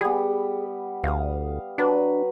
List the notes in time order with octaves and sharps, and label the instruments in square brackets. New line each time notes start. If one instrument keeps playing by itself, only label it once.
[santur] G3 B3 [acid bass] G#4
[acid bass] D2 [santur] F5 D#6
[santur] F#3 B4 [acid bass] D4